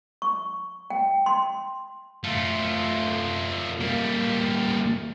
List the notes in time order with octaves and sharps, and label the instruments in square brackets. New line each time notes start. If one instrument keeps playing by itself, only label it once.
[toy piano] C#6
G5
C6
[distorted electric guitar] A3 F4
G3 A#3